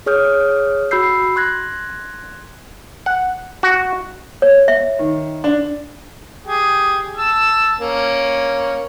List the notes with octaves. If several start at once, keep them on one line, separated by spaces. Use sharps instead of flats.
G#4 C#5 D#6 F6 G6
F#4 B5 E6 G6 C7
C6 F#6 G#6 A#6
F#5
F#4
C#5
E5
D#3
D4
G4 G#4
A5 E6
A#3 C#4